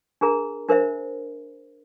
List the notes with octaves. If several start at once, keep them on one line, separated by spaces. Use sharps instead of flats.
D4 G#4 A#4 A#5
D4 A#4 C5 E5